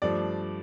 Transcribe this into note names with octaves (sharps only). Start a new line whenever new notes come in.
G2 F3 A3 D5